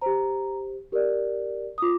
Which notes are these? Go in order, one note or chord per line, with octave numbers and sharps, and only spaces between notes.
G4 C5 A#5
G4 A#4 D5
D#6
F4 D6